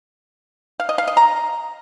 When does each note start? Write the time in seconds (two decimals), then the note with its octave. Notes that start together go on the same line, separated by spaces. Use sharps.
0.80 F5
0.89 D#5
0.98 F5
1.08 D#5
1.17 A#5